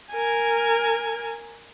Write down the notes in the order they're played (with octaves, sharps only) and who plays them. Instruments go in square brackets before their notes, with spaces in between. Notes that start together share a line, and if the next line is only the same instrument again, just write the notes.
[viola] A#4 G#5